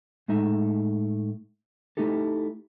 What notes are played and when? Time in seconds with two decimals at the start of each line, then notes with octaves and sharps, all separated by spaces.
0.28 A2 G#3 A3 D#4 E5
1.97 A3 D#4 E4 G4 A4